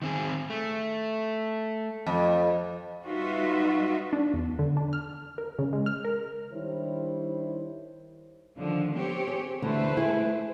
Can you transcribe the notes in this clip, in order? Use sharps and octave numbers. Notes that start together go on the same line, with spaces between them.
D#3 C4 G#4
A3
F2
G3 D#4 F4 F#4 B4 E5
D4
E2
D3
D4
F6
A#4
C#3
G#3
F6
A#4
D#3 G3 D4 E4 C5 C#5
D3 D#3 F3
C4 G4 C#5
G#4
D2 D3 E3 A3 B4 C5
E4 G#4